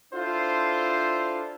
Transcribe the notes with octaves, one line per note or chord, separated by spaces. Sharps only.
D4 E4 F4 A4 C5